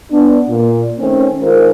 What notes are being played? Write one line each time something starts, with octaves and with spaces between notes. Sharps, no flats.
B3 D4
A#2
D#3 A3 C4 C#4
D#3 G#3 F4 A#4 C5